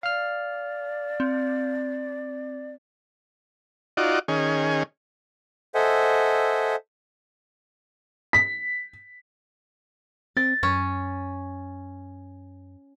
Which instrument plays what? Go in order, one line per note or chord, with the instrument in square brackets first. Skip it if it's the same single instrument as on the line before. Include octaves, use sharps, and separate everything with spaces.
[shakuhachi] D5 [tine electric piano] F5 F6
[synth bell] C4
[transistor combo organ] D#4 F4 F#4 D5
D#3 C#4 G#4
[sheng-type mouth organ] A4 C5 D#5 E5 F#5 G#5
[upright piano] B6
[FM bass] C4 [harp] A6
[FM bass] F#2 [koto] C#4